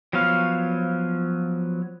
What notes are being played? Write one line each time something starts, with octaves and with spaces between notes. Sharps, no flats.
F3 F#3 B3 C#5 F5